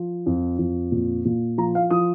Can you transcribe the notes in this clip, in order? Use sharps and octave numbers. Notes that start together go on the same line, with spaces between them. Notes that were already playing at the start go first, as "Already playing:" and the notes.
Already playing: F3
F2
F2
A#2
A#2
F3 A#5
F5
F3 D#6